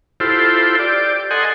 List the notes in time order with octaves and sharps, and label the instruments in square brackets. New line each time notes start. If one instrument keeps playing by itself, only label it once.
[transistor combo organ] E4 F4 G4 A4 C5
G4 D5
A4 D#5 F#5 G#5 C6